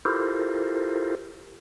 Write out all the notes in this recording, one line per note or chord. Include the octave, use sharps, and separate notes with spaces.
E4 F4 G4 A4 A#4 C5